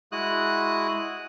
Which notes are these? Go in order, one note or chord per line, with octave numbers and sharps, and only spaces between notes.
G#3 E4 F#4 D#6 F#6